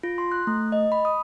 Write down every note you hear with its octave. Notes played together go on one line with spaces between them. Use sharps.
F4
C6
F#6
A3
D#5
B5
D#6